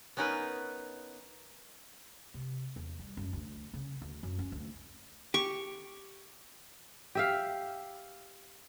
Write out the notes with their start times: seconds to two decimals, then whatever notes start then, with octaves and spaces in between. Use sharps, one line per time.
0.17 B3 C#4 D#4 A#4 B4
2.34 C3
2.76 E2
2.99 G3
3.17 F#2
3.33 D2
3.74 C#3
4.02 D2
4.23 F#2
4.39 C#4
4.52 D2
5.34 G4 C#6
7.15 G4 E5 F5